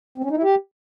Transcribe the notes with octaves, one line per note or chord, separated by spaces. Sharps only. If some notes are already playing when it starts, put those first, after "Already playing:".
C4
C#4
D#4
E4
G4